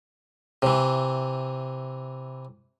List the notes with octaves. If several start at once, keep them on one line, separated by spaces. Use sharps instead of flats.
C3 E3